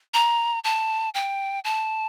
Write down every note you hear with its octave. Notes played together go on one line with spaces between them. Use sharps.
A#5
A5
G5
A5